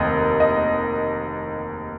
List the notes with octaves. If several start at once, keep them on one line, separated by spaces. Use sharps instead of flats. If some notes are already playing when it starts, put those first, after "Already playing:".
Already playing: F1 D#2 D#3 D#5
D#5